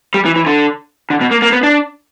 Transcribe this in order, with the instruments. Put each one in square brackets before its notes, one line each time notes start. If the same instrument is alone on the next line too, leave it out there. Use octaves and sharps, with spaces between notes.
[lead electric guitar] G3
E3
E3
D3
D3
B2
A#3
A#3
B3
D4